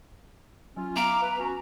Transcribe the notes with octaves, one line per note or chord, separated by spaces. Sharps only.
F#3 C#4 F4
B3 E5 F5 A#5 D6
B4
C#4 F#4